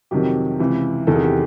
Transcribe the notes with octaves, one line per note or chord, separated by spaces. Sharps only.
F2 C3 D#3 F#3 G4
C#2 C3 E3
E2 C3 D#3 A4
G#4
G4